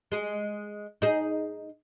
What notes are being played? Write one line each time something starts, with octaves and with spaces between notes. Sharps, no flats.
G#3 G#4
D#4 G#4